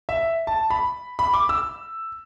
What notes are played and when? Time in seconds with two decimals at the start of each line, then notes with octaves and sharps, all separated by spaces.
0.09 E5
0.47 A5
0.70 B5
1.19 B5
1.33 D6
1.49 E6